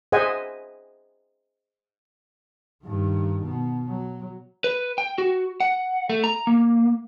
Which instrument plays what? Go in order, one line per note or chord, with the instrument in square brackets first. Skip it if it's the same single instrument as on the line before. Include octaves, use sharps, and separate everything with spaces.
[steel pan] G#4 C5 D#5 E5 F#5 G#5
[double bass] G2 D#3
B2
F#3
[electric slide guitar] B4
G5
F#4
F#5
A3
A#5
A#3